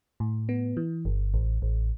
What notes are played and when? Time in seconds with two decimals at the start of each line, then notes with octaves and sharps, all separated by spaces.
0.20 A2
0.49 B3
0.77 E3
1.05 G1
1.34 A1
1.62 A1